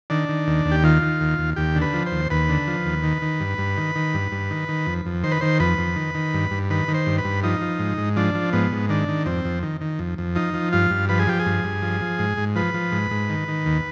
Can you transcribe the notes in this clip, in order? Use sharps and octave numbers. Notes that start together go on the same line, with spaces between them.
D#3 D4
D#3
D#2
D#2
G4
D#3 F4
D#3
D#2
D#2
D#2 G4
D3
B4
F3
C5
D#2
D#2 B4
D3
F3
D#2
D#3
D#3
G2
G2
D#3
D#3
G2
G2
D#3
D#3
F2
F2
D#3 C5
B4
D#3 C5
F2 B4
F2
D#3
D#3
G2
G2
D#3 B4
D#3
C5
G2
B4
G2
F3 D#4
F3
G#2
G#2
F3 D4
F3
G#2 B3
G#2
D#3 D4
D#3
F2 C4
F2
D#3
D#3
F2
F2
F3 D#4
F3
G2 F4
G2
F3 B4
G#4
F3 G4
G#4
G2
G2
F3
F3
G#2
G#2
F3 B4
F3
G#2
G#2
D#3
D#3
D#2